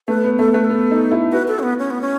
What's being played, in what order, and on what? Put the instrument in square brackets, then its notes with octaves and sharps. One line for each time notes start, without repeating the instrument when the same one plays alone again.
[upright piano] A3 [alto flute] B4
[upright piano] B3
[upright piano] A3 [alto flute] A4
[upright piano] A3 [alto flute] B4
[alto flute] A4
[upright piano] B3
D#4
E4
[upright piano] F#4 [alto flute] B4
[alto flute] A4
C#4
B3
C#4
B3
C#4